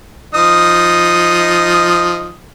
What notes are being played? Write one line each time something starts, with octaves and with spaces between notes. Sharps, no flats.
F3 D#4 D#6